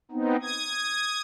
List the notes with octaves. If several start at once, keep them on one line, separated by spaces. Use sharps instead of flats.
B3 C4 D#4
D#6 G#6